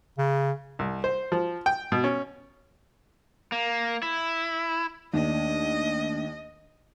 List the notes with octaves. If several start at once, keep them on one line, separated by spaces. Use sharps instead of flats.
C#3
C2
C5
F3
G5
B2
C#4
A#3
E4
D#2 A3 D4 D5 D#5